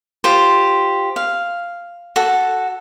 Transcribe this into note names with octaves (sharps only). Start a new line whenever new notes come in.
F4 G4 C5
F5
F#4 A4